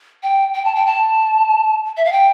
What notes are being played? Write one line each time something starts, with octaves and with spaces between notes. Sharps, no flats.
G5
G5
A5
G5
A5
E5
F5
G5